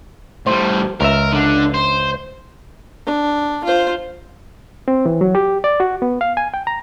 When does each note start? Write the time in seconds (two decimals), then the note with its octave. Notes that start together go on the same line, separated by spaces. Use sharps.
0.46 A2 G3 C5
1.01 C#2 A#4 E5
1.32 D3 D4
1.74 C5
3.07 D4
3.65 F4 C5
4.88 C4
5.06 E3
5.21 F#3
5.35 G4
5.64 D5
5.80 F#4
6.02 B3
6.21 F5
6.37 G#5
6.54 G5
6.67 A#5